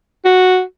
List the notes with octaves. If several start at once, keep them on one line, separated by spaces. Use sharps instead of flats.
F#4